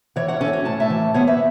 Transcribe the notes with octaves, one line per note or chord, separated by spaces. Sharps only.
E3 C#5 F#5
C#5 F#5
C#4 A4 C#5
F#4
A2 A5
E5 A5
E3
B3 C#5 F#5
B4 E5